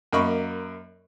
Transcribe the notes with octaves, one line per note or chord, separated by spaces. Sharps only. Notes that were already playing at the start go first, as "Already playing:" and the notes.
F#2 A#3 D#5 B5 C#6